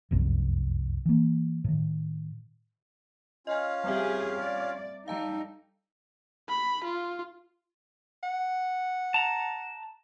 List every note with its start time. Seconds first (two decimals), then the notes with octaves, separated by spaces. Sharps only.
0.11 F1 C2 F#2
1.06 E3 A#3
1.64 A2 D#3
3.47 C#4 F4 D#5 F5 G#5
3.84 G3 C4 G4 G#4 E5
4.40 D5
5.08 G3 D#4 A4 F5 G5 A5 A#5
6.49 B5
6.84 F4
8.23 F#5
9.14 A5 A#5